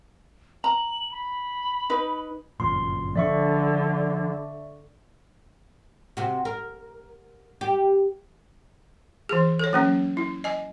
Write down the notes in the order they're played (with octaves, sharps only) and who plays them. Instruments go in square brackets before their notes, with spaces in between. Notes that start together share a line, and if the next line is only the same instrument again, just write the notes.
[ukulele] A#5 [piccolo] F#7
[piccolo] B5
[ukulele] D#4 B4
[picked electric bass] G1 F#2 A#2 [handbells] C6
[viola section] D3 [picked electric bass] F3 C4 D4 [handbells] D5 E5 C#6
[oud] C3 F#4
A#4
G4
[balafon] E3 G#4
A4 C#5
F#3 A#3 C#4
E4
D#5 G#5